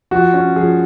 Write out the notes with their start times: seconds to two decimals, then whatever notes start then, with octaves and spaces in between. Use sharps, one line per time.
0.11 F3 F#4
0.34 C#4
0.56 F3 G#4